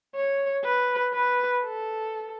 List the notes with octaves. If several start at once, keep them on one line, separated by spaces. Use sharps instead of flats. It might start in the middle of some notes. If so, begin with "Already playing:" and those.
C#5
B4
B4
A4